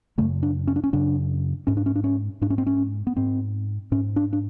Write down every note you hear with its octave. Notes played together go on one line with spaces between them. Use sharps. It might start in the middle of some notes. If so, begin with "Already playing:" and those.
F#2 C#3 A3
D4
C#4
D4
C#4
F#2 C#3 D4
G#2 C#4
D4
C#4
D4
C#4
G#2 D4
C#4
C4
C#4
B3
G#2 C4
G#2 C#4
D4
D4